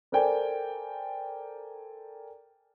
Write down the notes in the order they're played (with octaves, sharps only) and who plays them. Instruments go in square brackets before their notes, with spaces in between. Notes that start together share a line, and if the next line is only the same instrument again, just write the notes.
[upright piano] A4 A#4 C5 D5 G5 G#5